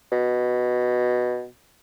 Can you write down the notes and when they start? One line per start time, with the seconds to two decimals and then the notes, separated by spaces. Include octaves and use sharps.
0.12 B2